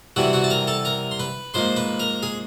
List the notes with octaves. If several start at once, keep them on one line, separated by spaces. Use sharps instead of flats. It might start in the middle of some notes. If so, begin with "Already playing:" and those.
C3 E3 G3 B3 F#4 F#5
F#4 F#5
A5
A#4 A#5
A4 A5
A#4 A#5
C6
B4 B5
G#2 F3 A#3 C5 C6
B4 B5
A#4 A#5
G#4 G#5